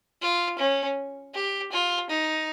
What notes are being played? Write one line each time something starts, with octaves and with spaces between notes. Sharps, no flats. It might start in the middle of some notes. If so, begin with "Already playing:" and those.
F4
C#4
G4
F4
D#4